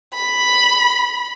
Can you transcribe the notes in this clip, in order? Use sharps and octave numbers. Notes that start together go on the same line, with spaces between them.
B5